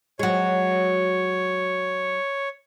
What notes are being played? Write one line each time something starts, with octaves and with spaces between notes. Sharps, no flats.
F#3 G#3 C#5